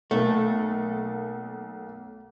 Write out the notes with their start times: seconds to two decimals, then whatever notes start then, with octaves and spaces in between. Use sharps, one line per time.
0.11 B1 A3 A#3 A4